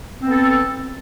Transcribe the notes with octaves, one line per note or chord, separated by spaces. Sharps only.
B3 C4 A4